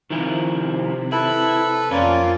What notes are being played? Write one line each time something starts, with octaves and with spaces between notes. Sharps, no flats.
C3 D#3 F3 E4
E4 A4 B4
F2 A#3 C#4 F4 D5